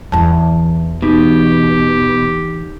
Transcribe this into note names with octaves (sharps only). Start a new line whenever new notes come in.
E2 E3 A5
B2 D#4 G4